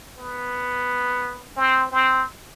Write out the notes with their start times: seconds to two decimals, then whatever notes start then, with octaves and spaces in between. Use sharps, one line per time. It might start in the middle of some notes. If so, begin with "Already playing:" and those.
0.18 B3
1.57 C4
1.92 C4